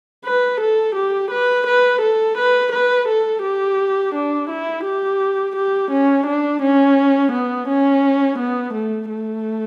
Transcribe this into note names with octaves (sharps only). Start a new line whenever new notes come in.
B4
A4
G4
B4
B4
A4
B4
B4
A4
G4
D4
E4
G4
G4
C#4
D4
C#4
B3
C#4
B3
A3
A3